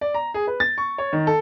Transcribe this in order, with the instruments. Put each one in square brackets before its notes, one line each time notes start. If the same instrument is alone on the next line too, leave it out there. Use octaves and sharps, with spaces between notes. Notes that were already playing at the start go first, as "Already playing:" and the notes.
[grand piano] D5
A#5
G#4
B4
A6
C#6
C#5
D#3
A4